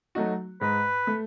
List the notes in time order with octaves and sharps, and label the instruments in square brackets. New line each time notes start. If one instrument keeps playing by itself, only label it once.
[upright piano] F#3 A3 D#4 F#4
[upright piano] G#2 [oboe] B4
[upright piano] A3